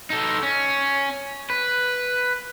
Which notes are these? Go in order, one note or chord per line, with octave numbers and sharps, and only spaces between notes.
D#4 A4
C#4
B4